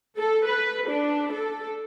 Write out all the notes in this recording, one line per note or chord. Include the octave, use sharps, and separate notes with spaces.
A4
B4
D4
A4